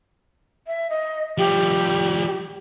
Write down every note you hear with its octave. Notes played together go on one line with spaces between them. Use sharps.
E5
D#5
F3 G3 G4